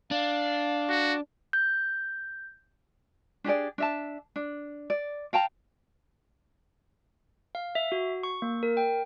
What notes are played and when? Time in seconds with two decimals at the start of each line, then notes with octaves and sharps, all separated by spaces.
0.11 D4 F5
0.89 F#4
1.53 G6
3.44 D4 G4 G#4 D5
3.78 D4 E5 A5
4.36 D4
4.90 D5
5.33 F5 G5 A5 A#5
7.55 F5
7.75 E5
7.92 F#4
8.23 C#6
8.42 A#3
8.63 A#4
8.77 G5